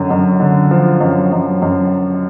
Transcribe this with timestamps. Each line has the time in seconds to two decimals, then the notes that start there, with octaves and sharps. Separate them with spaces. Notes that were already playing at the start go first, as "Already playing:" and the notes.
Already playing: F#2 D3
0.10 F#2
0.40 D3
0.71 F3
1.01 F#2
1.32 F#2
1.62 F#2